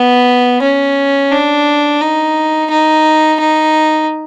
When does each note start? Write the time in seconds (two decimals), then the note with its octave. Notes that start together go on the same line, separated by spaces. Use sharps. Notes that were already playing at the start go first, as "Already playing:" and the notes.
Already playing: B3
0.62 C#4
1.32 D4
2.01 D#4
2.70 D#4
3.40 D#4